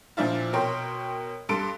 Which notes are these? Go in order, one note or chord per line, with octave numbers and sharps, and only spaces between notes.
A#2 F3 D4 E4 F4
B2 A#4 C#5 G5 C6
G2 A4 C6 D7